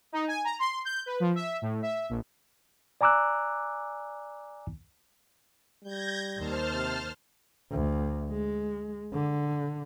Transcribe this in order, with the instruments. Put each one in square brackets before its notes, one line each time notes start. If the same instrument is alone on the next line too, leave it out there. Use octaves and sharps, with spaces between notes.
[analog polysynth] D#4
G#5
A#5
C6
G6
B4
F3
E5
A2
E5
A#1
[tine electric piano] D5 G#5 A#5 D6 E6 F#6
[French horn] G3 [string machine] G6 G#6 A#6
[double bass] D#2 [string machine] C5 A5 F6
[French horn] C3
[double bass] D2
G#3
D3